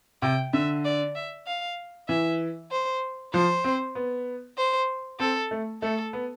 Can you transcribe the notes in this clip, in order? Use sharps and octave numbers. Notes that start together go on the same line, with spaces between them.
C3 G5
D3 E5
D5
E5
F5
E3 E5
C5
F3 C5
C4
B3
C5
C4 A4
A3
A3 A4
B3